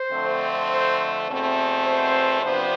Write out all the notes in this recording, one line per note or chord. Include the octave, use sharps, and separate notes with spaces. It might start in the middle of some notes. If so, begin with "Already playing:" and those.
Already playing: C5
F2 D3 A3 C4
C5
E2 B2 A3 C4
C5
C3 F3 B3 D4 C5